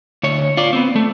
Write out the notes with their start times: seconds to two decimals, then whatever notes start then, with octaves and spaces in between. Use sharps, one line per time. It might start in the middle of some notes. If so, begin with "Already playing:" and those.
0.23 D2 C#5
0.57 F4 D5
0.73 B3 C4
0.96 A3